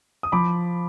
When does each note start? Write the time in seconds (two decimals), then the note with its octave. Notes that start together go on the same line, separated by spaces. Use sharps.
0.23 D#6
0.32 F3 B5 D6